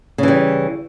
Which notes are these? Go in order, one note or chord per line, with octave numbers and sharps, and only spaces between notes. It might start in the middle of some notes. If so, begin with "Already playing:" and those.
C#3 E3 G3